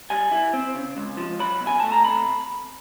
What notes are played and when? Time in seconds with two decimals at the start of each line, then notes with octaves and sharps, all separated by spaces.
0.10 G3 G#5
0.31 E4
0.53 C4
0.75 C#3
0.97 C#2
1.17 F3
1.40 F#3 B5
1.61 B2
1.67 G#5
1.80 A3 A5
1.92 A#5
2.04 C3 B5